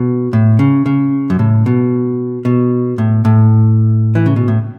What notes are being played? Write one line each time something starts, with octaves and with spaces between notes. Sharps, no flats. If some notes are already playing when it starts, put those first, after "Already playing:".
Already playing: B2
A2
C#3
C#3
F#2
A2
B2
B2
A2
A2
E3
C#3
B2
A2